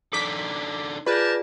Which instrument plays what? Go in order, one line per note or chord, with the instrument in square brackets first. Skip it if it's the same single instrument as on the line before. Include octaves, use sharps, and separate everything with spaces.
[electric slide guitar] D4 D#4 A4 [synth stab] D6 B6
[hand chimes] F4 G#4 D5 [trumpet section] G4 A#4 A5 [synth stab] B4